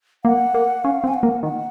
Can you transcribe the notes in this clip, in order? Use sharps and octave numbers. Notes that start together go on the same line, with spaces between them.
A#3 F#5
A#3
C#4 F5
C4
G#5
F#5
A#3
D#3 F#5